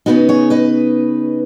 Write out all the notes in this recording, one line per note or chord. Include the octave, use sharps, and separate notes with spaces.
C#3 B3 D#4 F#4 B4
G#4 C#5
B4 D#5